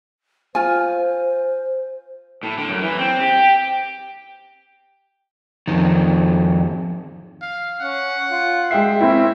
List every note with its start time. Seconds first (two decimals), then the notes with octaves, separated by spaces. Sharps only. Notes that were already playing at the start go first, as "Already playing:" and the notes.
0.55 F4 C5 G#5
2.43 A2
2.58 D3
2.69 F#2
2.81 E3
2.98 C4
3.20 G4
5.68 F2 D#3
7.42 F5
7.80 C#4 F#5
8.31 F4
8.71 G#3 E5 G5 C7
9.01 C4 C#4 E4